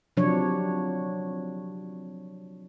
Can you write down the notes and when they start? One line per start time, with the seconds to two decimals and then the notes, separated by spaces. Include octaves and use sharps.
0.17 C3 F3 F#3 D4 C#5